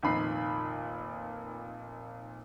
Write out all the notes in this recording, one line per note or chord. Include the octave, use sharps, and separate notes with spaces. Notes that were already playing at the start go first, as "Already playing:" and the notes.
F1 A#2 D#3 B5 C7